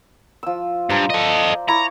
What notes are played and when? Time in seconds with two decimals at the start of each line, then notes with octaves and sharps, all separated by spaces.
0.43 F3 E6
0.90 G2 C5 A#5
1.10 A4 D5 D#5
1.68 E4 A#5 C#6 D6